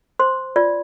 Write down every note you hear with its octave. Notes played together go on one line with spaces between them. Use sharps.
C5 C6
F4 D5